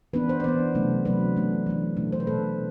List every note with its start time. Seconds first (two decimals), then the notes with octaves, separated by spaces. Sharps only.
0.13 E3 B3 D4 B4
0.29 C5
0.40 D5
0.44 E3 B3 D4 C5
0.75 C3 F#3 A3 D4
1.05 C3 F#3 A3 D4 B4
1.36 E3 A3 D4
1.66 E3 A3 D4
1.97 B2 A3 D4
2.12 C5
2.20 B4
2.27 B2 A3 D4 A4